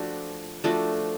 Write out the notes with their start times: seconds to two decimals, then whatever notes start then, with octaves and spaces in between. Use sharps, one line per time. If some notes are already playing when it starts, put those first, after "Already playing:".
Already playing: F3 A3 D4 F#4
0.64 F3 A3 D4 F#4